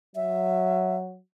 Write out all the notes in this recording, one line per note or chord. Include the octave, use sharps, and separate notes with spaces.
F#3 E5